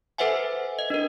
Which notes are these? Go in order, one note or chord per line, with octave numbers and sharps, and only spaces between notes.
A4 B4 C5 E5 F#5 G#5
D#5
D4 A#4